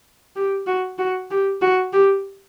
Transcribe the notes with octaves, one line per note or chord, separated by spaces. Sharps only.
G4
F#4
F#4
G4
F#4
G4